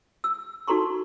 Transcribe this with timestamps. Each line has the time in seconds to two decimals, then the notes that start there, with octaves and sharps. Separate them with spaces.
0.24 E6
0.67 D#4 F#4 A4 A#5 C6 C#6